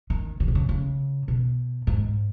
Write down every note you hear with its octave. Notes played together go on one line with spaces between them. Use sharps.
D#3
C#3
B2
C#3
C#3
B2
G#2